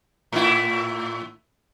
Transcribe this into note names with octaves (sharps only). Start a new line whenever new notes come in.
A2 E4